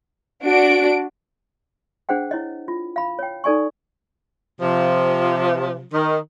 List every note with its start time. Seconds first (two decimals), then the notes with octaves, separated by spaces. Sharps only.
0.44 D4 F#4 D7
2.09 D4 G#4 C5 F#5 G5
2.31 E4 C#5 D#5
2.68 F4
2.96 F5 B5
3.19 C#5 G5
3.44 D#4 A4 D5 G#5 C#6
4.60 C3 F3
5.93 D#3